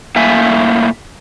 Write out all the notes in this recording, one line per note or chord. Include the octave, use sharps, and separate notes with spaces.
A2 A#3 E5 G#5